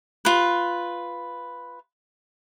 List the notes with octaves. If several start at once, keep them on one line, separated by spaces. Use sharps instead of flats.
F4 B4